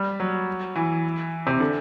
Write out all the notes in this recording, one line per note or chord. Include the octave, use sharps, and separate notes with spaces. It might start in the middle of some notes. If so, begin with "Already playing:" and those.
Already playing: G3
F#3
E3
C3
D3